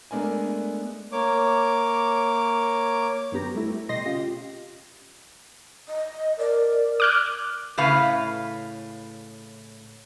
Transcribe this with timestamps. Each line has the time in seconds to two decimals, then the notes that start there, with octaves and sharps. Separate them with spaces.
0.11 G#3 A3 B3 D4 A#4 G#5
1.12 A#3 C#5 D6
3.32 F#2 D3 B3 G4 A#5
3.55 G3 A3 E4
3.89 B2 G4 D#5 C6 A#6
4.05 C#3 F4 G4
5.88 D#5
6.38 A#4 D5
7.00 D6 F6 F#6
7.78 A2 C#3 B4 F5